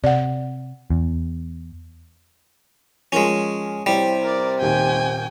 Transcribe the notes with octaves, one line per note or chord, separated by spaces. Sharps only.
C3 D5 F#5
E2
F3 G#3 C#4 F4 A#4
C3 G3 E4 C5 C#5
A#4 D5
D#1 D#2 G5 G#5